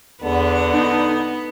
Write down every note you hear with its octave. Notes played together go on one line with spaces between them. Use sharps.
E2 D3 B3
D#4